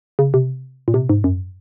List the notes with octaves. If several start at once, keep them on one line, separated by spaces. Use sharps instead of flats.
C#3
C3
A#2
C3
G#2
F#2